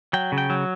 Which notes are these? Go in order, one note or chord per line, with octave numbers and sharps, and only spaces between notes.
F#3 G5
C#3
G5
F#3